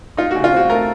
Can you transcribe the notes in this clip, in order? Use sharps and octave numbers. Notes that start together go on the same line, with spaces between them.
D#4 F4
F#4
C#3
F4
C4 F#4
A3 A#4